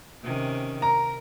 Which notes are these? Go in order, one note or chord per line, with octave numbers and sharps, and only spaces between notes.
C3 D#3 C#4
A#4 A#5